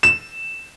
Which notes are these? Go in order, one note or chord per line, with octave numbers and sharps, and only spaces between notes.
E7